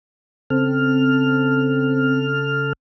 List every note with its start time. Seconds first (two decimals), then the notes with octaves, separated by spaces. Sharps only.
0.50 C#3 C4 A4 F6